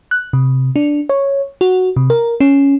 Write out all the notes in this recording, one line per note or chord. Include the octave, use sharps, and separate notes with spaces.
F#6
C3
D4
C#5
F#4
C3
A#4
C#4